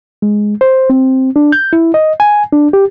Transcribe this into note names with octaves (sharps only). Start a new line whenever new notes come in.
G#3
C5
C4
D4
G6
E4
D#5
G#5
D4
G4